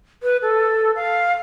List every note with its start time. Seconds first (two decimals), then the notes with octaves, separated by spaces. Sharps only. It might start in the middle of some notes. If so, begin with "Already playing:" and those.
0.23 B4
0.42 A4
0.96 F5